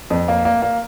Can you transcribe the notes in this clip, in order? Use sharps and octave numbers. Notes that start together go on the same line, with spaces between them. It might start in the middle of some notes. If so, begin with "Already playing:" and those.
F2
A#3
A#3
A#3